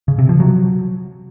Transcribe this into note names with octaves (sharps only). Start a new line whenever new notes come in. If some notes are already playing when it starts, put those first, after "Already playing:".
C#3
C3
F3
F#3